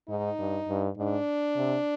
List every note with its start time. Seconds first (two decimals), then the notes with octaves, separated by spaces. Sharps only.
0.09 G#2 D#4
0.39 G2
0.69 G2
0.98 G#2 D4
1.57 C3